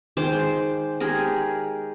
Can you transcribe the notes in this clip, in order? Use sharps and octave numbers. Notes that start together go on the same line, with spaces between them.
D#3 G#3 C5 D6
G#3 G4 G#4 A#4